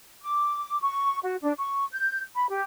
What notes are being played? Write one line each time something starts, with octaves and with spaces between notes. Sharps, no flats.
D6
C#6
F#4
D4
C#6
G6
B5
G4